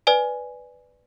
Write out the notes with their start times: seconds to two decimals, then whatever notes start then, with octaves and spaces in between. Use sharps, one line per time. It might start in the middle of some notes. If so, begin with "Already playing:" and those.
0.07 B4 D5 G#5